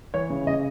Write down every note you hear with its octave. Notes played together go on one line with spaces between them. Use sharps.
E3 C#5
C#3
C#3 D#5